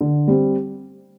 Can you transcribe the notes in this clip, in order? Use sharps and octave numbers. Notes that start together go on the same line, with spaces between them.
D3
G3 C4